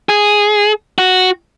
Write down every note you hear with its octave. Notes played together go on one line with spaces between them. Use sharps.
G#4
F#4